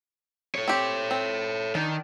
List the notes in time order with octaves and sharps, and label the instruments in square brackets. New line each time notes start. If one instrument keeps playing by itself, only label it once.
[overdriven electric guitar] A4 C#5
[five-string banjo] C4 G4
C4
[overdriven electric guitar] D#3 [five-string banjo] D4